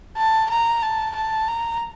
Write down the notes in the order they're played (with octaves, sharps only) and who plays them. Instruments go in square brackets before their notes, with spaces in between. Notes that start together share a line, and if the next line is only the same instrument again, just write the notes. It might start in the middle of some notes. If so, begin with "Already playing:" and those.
[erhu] A5
A#5
A5
A5
A#5